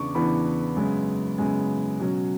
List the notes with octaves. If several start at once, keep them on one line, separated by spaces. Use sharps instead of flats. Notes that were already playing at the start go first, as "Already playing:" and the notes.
Already playing: E2 C#3 E3 B3 D4 C#6 D6
E2 C#3 E3 B3 D4 B5
F#2 C#3 G#3 B3
F#2 C#3 G#3 B3 G#5
B2 F#3 C#4